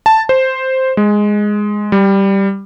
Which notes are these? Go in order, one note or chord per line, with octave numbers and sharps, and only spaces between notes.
A5
C5
G#3
G3